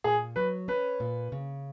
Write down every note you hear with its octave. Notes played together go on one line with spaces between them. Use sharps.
A#2 G#4
F#3 B4
C#4 B4
A#2
C#3